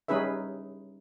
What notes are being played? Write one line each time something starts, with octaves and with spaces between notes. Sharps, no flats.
G3 C#4 D#4 G#4 B4 E5